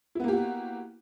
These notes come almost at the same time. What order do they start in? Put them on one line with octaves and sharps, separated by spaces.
E4 B3 A#3 G4 F#4